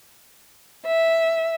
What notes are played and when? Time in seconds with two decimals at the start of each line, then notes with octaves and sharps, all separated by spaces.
0.88 E5